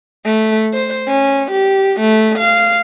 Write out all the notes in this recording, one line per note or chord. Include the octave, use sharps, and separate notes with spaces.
A3
C5
C#4
G4
A3
F5